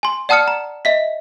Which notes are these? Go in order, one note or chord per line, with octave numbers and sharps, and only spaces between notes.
G#5 C6
D5 F#5 A5 D#6 F6 C#7
A#5
D#5 E5 B6